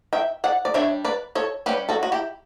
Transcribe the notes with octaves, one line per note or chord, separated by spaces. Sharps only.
E5 G5
D5 F#5
D5
G3 D4 C#5 E5
B4 D5
A4 C#5
G3 C#4 G4 B4
F#4 A4
F#4
E4 G4